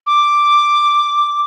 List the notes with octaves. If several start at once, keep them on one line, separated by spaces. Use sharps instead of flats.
D6